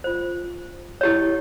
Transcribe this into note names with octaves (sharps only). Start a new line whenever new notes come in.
F4 C5
E4 G4 C#5